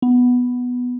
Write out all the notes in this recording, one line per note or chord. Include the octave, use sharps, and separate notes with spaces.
B3